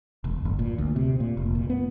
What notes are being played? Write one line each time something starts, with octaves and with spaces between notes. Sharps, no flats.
E1
G1
A#2
D2
C3
A#2
F1
A#2
B3